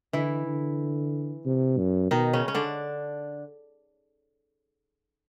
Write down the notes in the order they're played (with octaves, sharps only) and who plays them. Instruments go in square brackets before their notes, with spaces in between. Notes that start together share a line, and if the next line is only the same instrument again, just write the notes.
[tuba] D3 [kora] E3 E4
[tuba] D3
C3
F#2
[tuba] B2 [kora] D#3 D#4
[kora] C#3 C#4
C#4
D3 D4